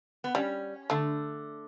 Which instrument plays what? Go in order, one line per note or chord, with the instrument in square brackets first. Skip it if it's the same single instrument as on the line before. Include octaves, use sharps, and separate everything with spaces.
[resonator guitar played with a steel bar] B3
[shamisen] G3 [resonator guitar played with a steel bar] C#4
[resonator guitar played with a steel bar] D3 [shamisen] A3